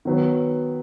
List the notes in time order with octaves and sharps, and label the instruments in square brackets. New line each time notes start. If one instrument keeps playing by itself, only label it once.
[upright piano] D#3 F#3 B3